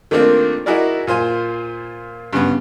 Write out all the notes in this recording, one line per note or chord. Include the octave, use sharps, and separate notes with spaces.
D#3 A3 A#3 C4 D4 F4
D#4 E4 F#4 G#4 A#4 D5
A#2 F4 C5 G#5
G2 C#3 B3